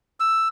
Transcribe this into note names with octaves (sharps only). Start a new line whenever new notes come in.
E6